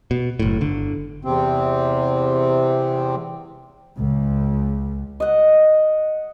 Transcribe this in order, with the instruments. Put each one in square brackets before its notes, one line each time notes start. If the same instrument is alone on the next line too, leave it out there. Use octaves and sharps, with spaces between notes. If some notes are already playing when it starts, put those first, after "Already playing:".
[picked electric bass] B2
F#1 A2
G1 D3
[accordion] E2 C3 C4
[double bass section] C#2
[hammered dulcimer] D#5 F#5